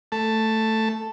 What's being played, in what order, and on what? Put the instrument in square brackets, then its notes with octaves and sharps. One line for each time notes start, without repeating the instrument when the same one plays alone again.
[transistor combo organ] A3 A5